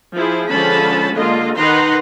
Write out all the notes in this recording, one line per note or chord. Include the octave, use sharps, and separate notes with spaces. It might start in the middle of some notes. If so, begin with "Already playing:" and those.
F3 E4 G#4
D3 F3 G#3 C#4 A5 B5
D3 G#3 A#3 F4 D#5
D#3 D#4 B4 F#5 A#5 C6